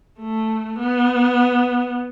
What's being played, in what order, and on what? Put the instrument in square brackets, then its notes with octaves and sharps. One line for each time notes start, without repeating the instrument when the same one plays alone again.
[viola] A3
B3